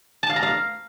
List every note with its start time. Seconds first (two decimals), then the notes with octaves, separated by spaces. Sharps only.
0.23 A5
0.30 F5
0.36 A#5
0.43 F5